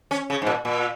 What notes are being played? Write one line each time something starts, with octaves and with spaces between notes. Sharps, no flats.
C#4
C#3
G#2
A#2
A#2